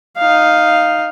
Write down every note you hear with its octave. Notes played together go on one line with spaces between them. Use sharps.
D#4 F5